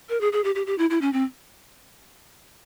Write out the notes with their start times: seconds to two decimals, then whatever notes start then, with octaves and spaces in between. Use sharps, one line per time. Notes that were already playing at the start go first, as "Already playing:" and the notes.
0.09 A#4
0.21 G#4
0.33 G#4
0.44 G4
0.55 G4
0.66 G4
0.78 E4
0.90 E4
1.01 C#4
1.13 C4